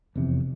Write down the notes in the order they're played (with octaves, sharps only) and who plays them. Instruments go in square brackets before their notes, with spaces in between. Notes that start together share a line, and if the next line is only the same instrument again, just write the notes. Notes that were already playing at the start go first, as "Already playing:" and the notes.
[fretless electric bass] F1 E2 C3